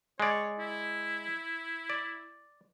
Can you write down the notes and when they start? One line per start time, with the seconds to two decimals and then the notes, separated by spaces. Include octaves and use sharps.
0.20 G#3 C#5 D5
0.59 E4
1.90 D5